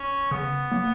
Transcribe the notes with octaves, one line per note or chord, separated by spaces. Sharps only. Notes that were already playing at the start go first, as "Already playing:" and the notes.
Already playing: C#4
C#3 B3
F#3 A#3